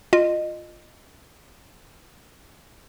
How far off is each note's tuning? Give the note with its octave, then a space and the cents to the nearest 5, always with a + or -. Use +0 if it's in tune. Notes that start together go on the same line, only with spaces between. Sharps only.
F4 +0 D#5 -20